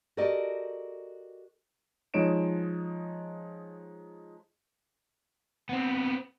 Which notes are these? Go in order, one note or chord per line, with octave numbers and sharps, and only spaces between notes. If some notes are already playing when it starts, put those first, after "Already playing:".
F#4 G4 A4 A#4 D5 D#5
F3 G#3 D#4 C#5 D7 E7
B3 C4